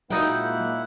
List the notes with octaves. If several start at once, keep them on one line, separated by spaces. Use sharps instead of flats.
A#2 F#3 G#3 A#3 D#4 E4 F#5 G5